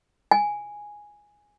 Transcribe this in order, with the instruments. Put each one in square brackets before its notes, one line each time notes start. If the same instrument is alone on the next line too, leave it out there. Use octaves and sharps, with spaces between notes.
[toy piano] G#5